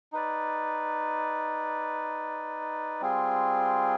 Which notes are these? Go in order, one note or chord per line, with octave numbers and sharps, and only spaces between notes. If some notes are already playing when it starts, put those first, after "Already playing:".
D#4 B4 D5
G3 C4 F4 G#4